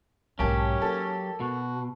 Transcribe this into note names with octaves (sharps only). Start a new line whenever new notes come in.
B1 G#2 F#3 A#3 C#4 G4 A5
A#3 D#4 A4
B2 F#4